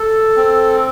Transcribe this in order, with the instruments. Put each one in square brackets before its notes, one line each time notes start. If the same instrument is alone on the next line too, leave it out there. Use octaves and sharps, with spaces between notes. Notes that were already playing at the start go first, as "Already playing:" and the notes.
Already playing: [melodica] A4
C4